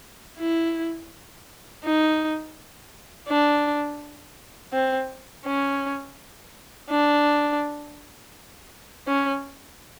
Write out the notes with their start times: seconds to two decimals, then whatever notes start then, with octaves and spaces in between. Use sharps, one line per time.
0.39 E4
1.84 D#4
3.28 D4
4.73 C4
5.46 C#4
6.90 D4
9.07 C#4